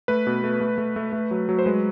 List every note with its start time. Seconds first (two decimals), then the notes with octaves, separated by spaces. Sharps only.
0.08 A3 B4
0.27 B2
0.43 A3
0.61 A3
0.78 A3
0.96 A3
1.13 A3
1.31 F#3
1.49 F#3
1.59 C5
1.65 G#3 B4